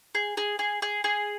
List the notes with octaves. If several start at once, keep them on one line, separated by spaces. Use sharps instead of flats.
G#4
G#4
G#4
G#4
G#4